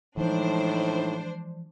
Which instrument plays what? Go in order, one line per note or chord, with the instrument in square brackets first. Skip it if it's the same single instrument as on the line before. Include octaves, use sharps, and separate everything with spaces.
[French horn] A2 [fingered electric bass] E3 F3 [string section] G#3 D4 C5 [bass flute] D#4